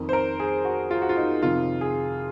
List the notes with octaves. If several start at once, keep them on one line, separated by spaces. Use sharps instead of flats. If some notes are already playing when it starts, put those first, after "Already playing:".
Already playing: F2 D#3
C5
A#4
G#4
F#4
F4
F#4
F4
D#4
F2 C3 D#3 F4
G#4